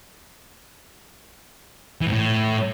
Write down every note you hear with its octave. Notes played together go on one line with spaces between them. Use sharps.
E3
G#2
A2